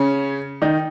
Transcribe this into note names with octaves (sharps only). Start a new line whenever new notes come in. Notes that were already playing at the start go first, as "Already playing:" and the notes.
Already playing: C#3 C#4
D#3 D#4